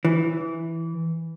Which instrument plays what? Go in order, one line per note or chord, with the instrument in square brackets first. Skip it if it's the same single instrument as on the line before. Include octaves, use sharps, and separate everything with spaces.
[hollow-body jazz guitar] E3